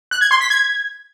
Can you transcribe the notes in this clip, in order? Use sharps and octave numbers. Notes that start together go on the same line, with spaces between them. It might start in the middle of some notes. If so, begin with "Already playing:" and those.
F#6
G#6
C6
B6
G#6